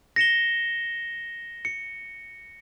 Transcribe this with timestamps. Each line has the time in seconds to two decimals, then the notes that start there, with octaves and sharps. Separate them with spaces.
0.16 A#6 C#7 E7 G7
1.65 C#7